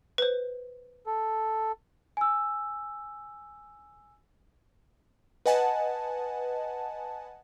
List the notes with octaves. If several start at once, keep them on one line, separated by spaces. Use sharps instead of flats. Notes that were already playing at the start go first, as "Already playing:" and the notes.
B4 C5
A4
G#5 E6
B4 D#5 F#5 G#5 A5